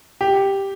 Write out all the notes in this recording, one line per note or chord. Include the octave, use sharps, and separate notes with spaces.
G4